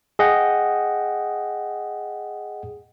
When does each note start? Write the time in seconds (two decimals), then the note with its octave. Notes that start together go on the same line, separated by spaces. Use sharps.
0.19 G#4 D#5 F#5 G5